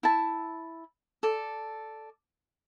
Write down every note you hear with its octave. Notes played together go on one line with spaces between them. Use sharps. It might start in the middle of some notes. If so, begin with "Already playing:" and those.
E4 A5
A4 D5